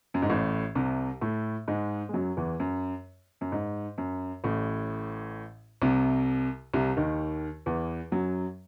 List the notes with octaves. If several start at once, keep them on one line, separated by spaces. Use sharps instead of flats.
F#2
G#2
A1 A2
C2 C3
A2 A3
G#2 G#3
G#3
F#2 F#3
E2 E3
F#2
F#2
G#2
F#2
A1 A2
C2 C3
C2 C3
D#2 D#3
E2 E3
F#2 F#3